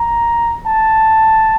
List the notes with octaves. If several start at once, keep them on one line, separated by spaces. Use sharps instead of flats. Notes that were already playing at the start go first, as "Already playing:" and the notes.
Already playing: A#5
A5